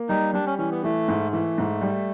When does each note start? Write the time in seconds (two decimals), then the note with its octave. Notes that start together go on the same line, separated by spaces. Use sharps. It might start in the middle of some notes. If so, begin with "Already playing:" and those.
Already playing: A#3
0.09 G3 D#4
0.34 G3 D4
0.46 C#4
0.58 E3 C#4
0.71 B3
0.83 E3 A3
1.08 G#2
1.32 E3 A3
1.58 G#2
1.81 G3